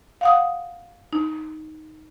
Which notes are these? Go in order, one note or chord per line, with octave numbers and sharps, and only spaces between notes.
F5 F#5 D#6
D#4